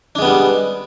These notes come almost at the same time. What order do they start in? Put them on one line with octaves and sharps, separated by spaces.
D4 G#3 B3 G3